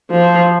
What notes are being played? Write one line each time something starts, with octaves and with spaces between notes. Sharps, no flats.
F3